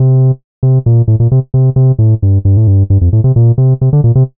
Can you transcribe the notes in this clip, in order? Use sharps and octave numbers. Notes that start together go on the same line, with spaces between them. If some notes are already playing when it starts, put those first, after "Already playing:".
Already playing: C3
C3
A#2
A2
A#2
C3
C3
C3
A2
G2
G2
A2
G2
G2
F2
A2
C3
A#2
C3
C3
D3
A#2
C3